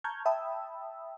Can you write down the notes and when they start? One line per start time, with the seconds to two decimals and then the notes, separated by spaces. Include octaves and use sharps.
0.04 A5 A#5 C#6 F6 G6 G#6
0.25 E5 G5 A5 B5 D#6 E6